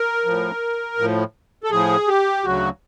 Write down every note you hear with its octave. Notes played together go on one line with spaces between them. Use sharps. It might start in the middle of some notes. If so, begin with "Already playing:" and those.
Already playing: A#4
A2 F3
A2 F3
A4
A2 F3 G#4
G4
D2 C#3 F#3 F#4